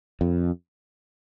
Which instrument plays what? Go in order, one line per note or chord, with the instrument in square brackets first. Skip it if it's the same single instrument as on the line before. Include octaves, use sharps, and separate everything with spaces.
[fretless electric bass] F2